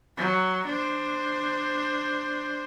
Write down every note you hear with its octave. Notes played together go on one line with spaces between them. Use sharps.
F#3
D4 C5